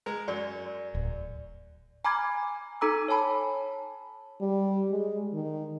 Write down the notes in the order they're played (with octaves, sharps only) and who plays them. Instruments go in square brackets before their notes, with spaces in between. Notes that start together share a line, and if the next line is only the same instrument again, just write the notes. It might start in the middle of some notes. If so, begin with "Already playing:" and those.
[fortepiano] G#3 A#4
[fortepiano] F#2 [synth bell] D5
[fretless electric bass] D1
[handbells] G#5 A#5 B5 D6 F6 G#6
D#4 A4 A#5 D6 E6
C#5 G#5 A5 B5
[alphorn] G3
G#3
D#3